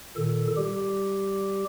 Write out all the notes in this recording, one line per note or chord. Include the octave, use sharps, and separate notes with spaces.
A#2 D#3 A4
G3 G4